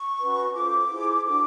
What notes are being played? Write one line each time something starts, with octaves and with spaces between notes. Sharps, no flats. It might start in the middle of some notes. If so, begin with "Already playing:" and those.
Already playing: C#6
C#4 F#4 B4
F4 A4 C5 D6
E4 G#4 C5
D4 F#4 A4 D6